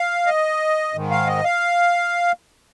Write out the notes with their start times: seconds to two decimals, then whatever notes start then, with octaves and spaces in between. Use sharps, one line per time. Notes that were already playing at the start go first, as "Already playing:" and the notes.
Already playing: F5
0.26 D#5
0.94 G#2 D#3
1.11 F5
1.27 D#5
1.44 F5